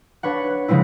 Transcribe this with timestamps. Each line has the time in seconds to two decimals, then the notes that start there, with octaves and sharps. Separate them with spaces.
0.23 D4 B4 C#5 F#5
0.68 C#3 F3 G#3 C4 E4